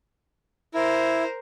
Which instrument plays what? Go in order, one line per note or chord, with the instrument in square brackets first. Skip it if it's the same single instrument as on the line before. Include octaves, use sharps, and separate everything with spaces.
[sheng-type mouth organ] E4 [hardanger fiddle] A#4 C5